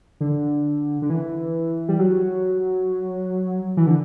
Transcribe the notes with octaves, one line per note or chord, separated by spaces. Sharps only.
D3
D3
E3
G3
F#3
E3
D3